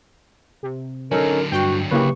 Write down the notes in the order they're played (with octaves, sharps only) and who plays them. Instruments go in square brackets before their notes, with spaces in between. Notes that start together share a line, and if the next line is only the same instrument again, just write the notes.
[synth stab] C3
[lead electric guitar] D3 F#3 [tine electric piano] C#4 D#4 A4 [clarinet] A#4
[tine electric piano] G2 [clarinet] F#4 [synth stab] G5
[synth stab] C#3 A#3 E4 [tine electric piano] G4 B4 [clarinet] C#6